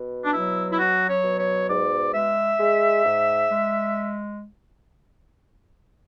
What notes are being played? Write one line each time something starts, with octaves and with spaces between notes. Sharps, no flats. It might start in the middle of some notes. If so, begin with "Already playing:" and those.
Already playing: B2
D4
F#3 E4
E4
F#3 F#4
C#5
B2
C#5
G#2 D5
G#3 E5
G#3
G#2
G#3